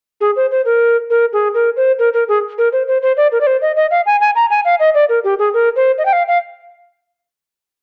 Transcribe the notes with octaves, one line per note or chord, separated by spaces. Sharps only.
G#4
C5
C5
A#4
A#4
G#4
A#4
C5
A#4
A#4
G#4
A#4
C5
C5
C5
D5
A#4
D5
C5
D#5
D#5
F5
G#5
G#5
A#5
G#5
F5
D#5
D5
A#4
G4
G#4
A#4
C5
D#5
G5
F5
F5